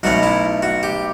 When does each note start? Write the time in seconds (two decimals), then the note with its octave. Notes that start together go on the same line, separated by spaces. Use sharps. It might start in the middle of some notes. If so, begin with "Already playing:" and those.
0.03 B1 B2 A3 C#4 F#4
0.23 E4
0.62 F#4
0.83 G4